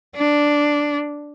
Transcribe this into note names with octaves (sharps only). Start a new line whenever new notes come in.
D4